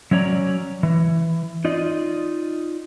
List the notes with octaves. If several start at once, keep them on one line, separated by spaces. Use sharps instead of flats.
F#3 C#4 C#5 D5 A#5
E3
D#4 F4 D5 D#5